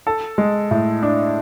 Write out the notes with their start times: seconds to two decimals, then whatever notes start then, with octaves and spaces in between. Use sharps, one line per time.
0.07 A4
0.38 G#3
0.71 A2
1.03 D4